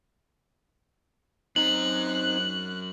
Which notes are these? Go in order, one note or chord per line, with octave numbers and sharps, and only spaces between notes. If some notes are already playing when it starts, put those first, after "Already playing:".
F#2 C4 D#4 A#5 F#6 F#7